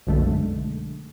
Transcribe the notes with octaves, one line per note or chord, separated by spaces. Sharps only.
B1 F#2 D3 G#3 A3